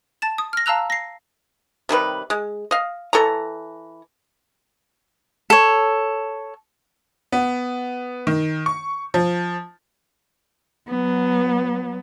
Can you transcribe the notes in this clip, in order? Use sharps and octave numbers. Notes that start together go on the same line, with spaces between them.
A5 A6 E7
D#6
F6 A#6
F5 A5 A#5 E6 F#6 F7
A#6 C7
C3 D#3 G3 B4
G#3
D#5 F5
E3 A4 C#5 A#5
A4 C#5
B3
D#3
C#6
F3
F#3 B3